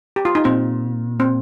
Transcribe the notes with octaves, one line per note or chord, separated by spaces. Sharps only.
G4
F4
D#4
A#2 C4
C4